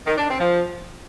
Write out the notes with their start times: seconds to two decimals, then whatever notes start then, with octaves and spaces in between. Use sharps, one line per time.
0.07 D#3
0.18 D4
0.29 C4
0.40 F3